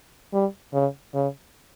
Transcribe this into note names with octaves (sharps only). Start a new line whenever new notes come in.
G3
C#3
C#3